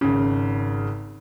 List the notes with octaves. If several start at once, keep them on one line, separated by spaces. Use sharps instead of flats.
G#1 C#3